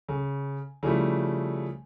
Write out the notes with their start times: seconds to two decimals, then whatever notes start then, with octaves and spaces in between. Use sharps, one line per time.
0.09 C#3
0.83 C#3 F3 G3 A3 E4